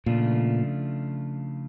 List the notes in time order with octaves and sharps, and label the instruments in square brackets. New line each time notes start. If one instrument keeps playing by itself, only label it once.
[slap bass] A#2 [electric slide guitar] C#3 F3 A3 D4 F4